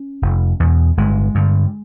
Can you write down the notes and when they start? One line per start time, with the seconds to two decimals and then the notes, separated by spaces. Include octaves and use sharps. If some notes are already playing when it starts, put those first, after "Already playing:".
Already playing: C#4
0.22 F1
0.60 E2 B2
0.97 G1 G#3
1.35 G2 D3